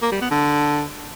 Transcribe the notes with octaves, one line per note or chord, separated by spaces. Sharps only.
A#3
G3
B3
D3